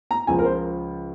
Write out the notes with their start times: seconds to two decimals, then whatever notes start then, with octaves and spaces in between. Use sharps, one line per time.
0.11 A#5
0.27 C#2 C#3 F3 G#5
0.39 A#4
0.45 C5